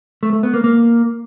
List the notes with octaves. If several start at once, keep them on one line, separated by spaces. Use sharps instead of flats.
A3
A3
B3
A#3
A#3